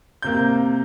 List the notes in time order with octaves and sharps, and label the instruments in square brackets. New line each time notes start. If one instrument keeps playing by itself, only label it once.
[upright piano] C3 A#3 G6